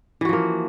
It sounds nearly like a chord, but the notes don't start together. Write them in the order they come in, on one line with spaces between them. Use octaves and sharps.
E3 F#4 F3 A#3